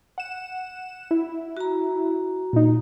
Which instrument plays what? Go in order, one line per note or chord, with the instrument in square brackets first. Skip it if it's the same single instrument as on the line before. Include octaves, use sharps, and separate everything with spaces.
[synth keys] F#5 E7
E4
[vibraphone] F#4 A#5
[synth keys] A#2 D#4